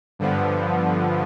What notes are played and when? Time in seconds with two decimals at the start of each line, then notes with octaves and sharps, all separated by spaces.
0.19 G2 D3 F3 B3